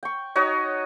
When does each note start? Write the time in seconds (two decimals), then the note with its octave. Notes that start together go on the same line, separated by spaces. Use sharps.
0.03 G5 C#6
0.35 D#4 F#4 C#5 D#5